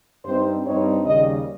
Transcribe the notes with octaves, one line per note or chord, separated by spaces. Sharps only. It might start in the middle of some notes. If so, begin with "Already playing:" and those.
G2 G3 C4 D#4 C5
G2 G3 C4 D#4 C#5
D#2 C#3 G3 D#5